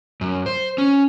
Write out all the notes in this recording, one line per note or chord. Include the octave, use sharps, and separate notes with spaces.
F#2
C5
C#4